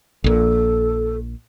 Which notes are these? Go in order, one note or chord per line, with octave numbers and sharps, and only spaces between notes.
A#1 A#2 A4